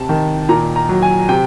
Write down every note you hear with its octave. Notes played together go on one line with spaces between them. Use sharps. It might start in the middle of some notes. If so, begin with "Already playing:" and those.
Already playing: C3 A5
D#3
A#2 A#5
A#5
F#3
G#5
C3 G5